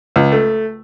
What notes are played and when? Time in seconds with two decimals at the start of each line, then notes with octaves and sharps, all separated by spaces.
0.16 C#2
0.32 A3